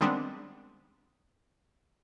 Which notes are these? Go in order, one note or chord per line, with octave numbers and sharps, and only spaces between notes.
D#3 G3 G#3 B3 C4 D4